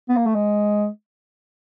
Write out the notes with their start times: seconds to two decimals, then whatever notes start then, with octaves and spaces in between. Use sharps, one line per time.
0.09 B3
0.17 A#3
0.26 A3
0.35 G#3